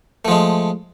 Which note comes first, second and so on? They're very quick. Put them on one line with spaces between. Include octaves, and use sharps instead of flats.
A3 F3 G#3